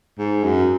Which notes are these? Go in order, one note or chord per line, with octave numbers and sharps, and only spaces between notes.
G#2
F#2